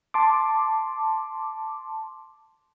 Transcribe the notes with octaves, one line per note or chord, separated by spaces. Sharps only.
A5 C6 D6